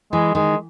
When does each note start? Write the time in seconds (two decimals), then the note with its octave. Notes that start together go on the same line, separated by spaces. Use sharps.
0.12 E3 G#3
0.35 D#3 G#3